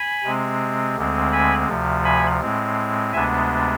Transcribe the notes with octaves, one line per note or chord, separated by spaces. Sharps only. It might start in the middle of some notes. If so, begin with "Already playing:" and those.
Already playing: G#5 B5
C3 G#3 C4
D2 D3 G#3 C4
G#5 B5
D2 C3 F3
G#5 B5
A2 G#3 C4
D2 C3 G#3 B3 D4 E5 G#5